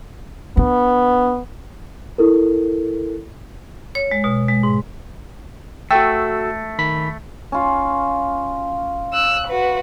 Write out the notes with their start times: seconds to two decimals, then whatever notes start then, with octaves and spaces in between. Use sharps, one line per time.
0.57 B3 D4
2.18 E4 A4 A#4
3.95 C#5
4.11 G#3
4.24 B2
4.48 G#3
4.63 G#2
5.91 A3 F#4 A4 G5 E6
6.79 D#3 B5 B6
7.52 C#4 F4
9.13 E6 F#6
9.47 F#4 B4